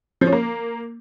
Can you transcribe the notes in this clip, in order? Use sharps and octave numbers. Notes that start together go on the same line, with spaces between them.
F3
C#4
A#3